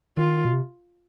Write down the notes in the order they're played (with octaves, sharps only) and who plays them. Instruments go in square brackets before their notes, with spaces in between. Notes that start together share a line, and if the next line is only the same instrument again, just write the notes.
[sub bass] D#3 [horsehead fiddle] F4
[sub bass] B2
C3